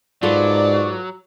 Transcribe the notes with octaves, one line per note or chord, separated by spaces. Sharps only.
G#2 F#3 F4 A4 B4 D5